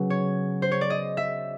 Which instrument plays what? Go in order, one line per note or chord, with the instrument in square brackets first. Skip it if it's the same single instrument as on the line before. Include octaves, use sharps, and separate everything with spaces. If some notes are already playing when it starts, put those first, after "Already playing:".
Already playing: [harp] C#3 F#3 B3
C#5
C5
C#5
D5
D#5
E5